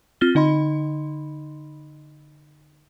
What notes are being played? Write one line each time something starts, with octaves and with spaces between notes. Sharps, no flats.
C4 F4 F6 A6 G7
D3 D#4 D#5 B5 C6